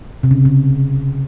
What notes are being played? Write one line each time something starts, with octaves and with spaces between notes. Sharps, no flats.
C3
C#3
C#3